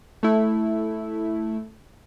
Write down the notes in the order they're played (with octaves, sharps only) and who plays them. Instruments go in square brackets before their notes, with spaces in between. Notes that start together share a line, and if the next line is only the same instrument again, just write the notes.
[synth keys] A3 E4